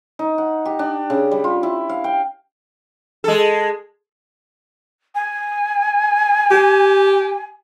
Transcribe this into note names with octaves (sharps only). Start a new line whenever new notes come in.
D#4
F#5
G4
D4
C#3
G3
F4
E4
F5
G5
G#3 A4
G#5
G4